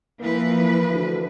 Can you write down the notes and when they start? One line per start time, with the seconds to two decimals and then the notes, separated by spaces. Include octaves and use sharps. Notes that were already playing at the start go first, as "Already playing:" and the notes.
0.21 E3 F3 A#3 B4
0.91 D2